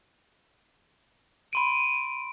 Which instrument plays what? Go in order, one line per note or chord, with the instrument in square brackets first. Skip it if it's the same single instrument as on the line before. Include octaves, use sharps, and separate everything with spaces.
[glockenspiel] B5 C6 D7 [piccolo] D#7